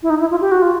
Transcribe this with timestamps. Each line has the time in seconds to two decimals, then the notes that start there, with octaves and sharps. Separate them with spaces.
0.03 E4
0.10 D#4
0.20 E4
0.31 F4
0.41 G4
0.51 F#4
0.62 F4